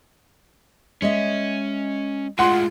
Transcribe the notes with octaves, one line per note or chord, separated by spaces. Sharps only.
G#3 C#4 D#5 E5
A2 G#3 F4 F#5 C6